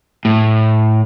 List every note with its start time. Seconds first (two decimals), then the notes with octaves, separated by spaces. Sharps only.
0.25 A2